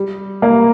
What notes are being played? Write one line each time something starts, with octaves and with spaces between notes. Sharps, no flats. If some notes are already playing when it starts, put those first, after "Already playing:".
Already playing: G3
A#3